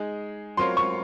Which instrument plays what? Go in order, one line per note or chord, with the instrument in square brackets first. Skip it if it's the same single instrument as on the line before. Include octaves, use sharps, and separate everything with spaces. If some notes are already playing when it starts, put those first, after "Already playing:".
Already playing: [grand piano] G#3 D#4 G#4
[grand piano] F#3 C4 F4 A#4 C#5 [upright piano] C6
[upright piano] C#6